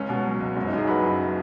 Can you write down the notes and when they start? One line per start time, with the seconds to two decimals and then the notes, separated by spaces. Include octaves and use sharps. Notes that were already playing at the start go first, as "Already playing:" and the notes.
Already playing: C#2 C#4
0.09 B2
0.25 F#3
0.40 C#2
0.56 F#1 C#4
0.68 D#4
0.73 F#2 G#4
0.87 F#3 B4
1.04 F#1